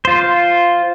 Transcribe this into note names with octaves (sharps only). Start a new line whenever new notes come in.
F4 C5